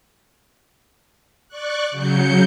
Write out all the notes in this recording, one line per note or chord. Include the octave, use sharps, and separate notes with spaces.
D5 C#6 F#6
C#3 F#3 G6 C#7